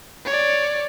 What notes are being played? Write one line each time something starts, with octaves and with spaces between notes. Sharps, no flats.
C#5 D5